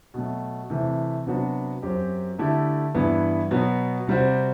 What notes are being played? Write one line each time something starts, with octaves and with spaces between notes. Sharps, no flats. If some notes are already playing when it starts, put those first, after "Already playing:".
B2 F#3 A3
C3 E3 A3
C3 F#3 B3 D4 F#4
F#2 F#3 C4 G4
D3 A3 E4 G4
G2 E3 B3 E4
B2 F#3 B3
C3 G3 C4 F#4